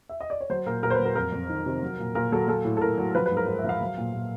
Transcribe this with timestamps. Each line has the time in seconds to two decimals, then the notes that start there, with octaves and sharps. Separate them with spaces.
0.09 E5
0.21 D#5
0.30 D5
0.41 C#5
0.50 F#3 C5
0.66 A#2 A#4
0.83 A#2 A#4
0.90 C5
0.94 B4
0.99 F#3
1.05 A#4
1.16 F2 A#4
1.32 F2
1.49 D#3
1.66 C3
1.83 F#3
1.99 A#2
2.15 A#2 A#4
2.32 F#3 A4
2.48 F#3 A4
2.65 A2
2.77 A4
2.81 A2 A#4
2.98 F#3
3.15 F3 B4
3.26 B4
3.31 G#2
3.37 A#4
3.47 G#2 A#4
3.59 E5
3.64 F3 F5
3.81 F#3
3.98 A#2
4.14 A#2